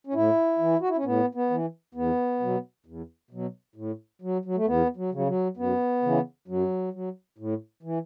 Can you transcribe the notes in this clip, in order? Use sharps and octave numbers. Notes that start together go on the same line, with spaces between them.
C#4
A2 E4
E3
F#4
E4
C#4
A2 B3
B3
E3
E2 B3
B2 F#3
E2
B2 F#3
A2
F#3
F#3
A3
E2 B3
F#3
C#3 F#3
F#3
F#2 B3
C#3 E3
F#2 F#3
F#3
A2
E3